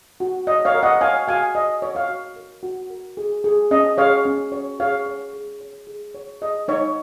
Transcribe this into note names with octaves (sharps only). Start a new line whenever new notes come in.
F#4
C#5 D#5
C#5 F5
A#4
D#5 F#5
C#5 F5 G#5
F#4 F5 G#5
C#5 D#5
C#5
C#5 F5
F#4
A#4
F#4
A#4
G#4
G#4
C#4 D#5
G#4 C#5 F5
C#4
C#5
G#4 C#5 F5
C#5
G#4
C#5
G#4
C#5
G#4 D#5
D#4 C#5